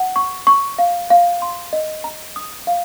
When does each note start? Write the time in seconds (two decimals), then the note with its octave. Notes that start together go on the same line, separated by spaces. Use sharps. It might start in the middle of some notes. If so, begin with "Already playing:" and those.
Already playing: F#5
0.16 C#6
0.47 C#6
0.79 F5
1.10 F5
1.42 C6
1.73 D#5
2.04 A#5
2.36 D#6
2.67 F5